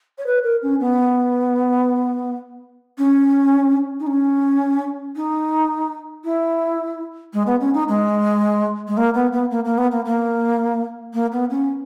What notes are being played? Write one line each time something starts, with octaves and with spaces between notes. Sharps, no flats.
C#5
B4
A#4
C#4
B3
C#4
D#4
C#4
D#4
E4
G#3
B3
C#4
D#4
G#3
G#3
A#3
B3
B3
A#3
A#3
B3
A#3
A#3
A#3
B3
C#4